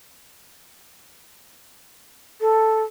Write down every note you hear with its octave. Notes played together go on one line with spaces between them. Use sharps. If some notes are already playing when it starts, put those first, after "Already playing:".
A4